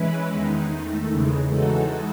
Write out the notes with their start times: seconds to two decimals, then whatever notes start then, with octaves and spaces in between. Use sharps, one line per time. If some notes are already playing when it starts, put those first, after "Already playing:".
Already playing: E3 G#3 C#4 E4 B4
0.27 E2 D#3 G#3 D#4
0.68 D#3 A3 D#4
1.10 E2 C#3 E3 G#3
1.51 E3 G#3 D#4 F#4 A4